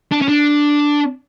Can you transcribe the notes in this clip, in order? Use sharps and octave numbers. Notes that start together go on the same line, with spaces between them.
D4
C#4
D4